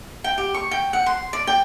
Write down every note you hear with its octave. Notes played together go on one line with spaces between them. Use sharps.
G5
G4
C#6
G5
F#5
C6
D5
G5